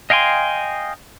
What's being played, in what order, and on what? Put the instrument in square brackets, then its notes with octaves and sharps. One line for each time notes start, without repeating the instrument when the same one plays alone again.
[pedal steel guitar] D#5 F5 G5 G#5 C6